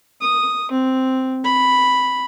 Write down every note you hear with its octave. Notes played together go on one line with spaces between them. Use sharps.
D#6
C4
B5